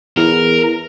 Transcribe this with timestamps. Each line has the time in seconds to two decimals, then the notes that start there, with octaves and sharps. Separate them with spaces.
0.17 E2 A#4